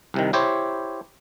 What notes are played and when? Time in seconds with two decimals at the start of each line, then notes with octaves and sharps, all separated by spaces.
0.14 C2 C3 D#3
0.33 E4 G4 C5 C#5